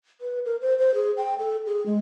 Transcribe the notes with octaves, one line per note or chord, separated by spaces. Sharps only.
B4
A#4
C5
C5
G#4
G5
A4
G#4
G#3